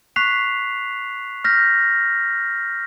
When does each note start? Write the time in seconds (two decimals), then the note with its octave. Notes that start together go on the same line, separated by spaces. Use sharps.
0.16 C#6 F#6 B6 C7 F7
1.44 F6 G6 A#6 B6